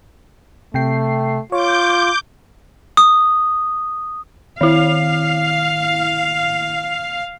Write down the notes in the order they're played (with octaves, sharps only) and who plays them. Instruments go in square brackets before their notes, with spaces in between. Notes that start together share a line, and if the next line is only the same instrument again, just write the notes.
[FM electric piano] C3 G5 C7 [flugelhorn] A3
[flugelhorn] F4 [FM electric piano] C#5 [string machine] D6 G6
[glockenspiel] D#6
[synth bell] D#3 E4 [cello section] F5